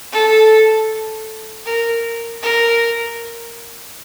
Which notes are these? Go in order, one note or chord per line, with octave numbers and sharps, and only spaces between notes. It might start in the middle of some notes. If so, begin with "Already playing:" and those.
A4
A#4
A#4